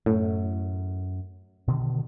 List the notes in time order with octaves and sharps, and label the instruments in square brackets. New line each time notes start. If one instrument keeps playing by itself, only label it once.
[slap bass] F#2 [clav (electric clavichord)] A2
[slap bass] B2 D3 D#3